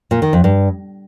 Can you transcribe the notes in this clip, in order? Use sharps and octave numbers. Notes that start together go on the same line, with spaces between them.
A#2
D#3
F2
G2